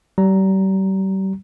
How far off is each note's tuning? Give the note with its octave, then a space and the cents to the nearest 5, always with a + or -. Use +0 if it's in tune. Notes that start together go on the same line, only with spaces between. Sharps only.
G3 -35 A#5 +0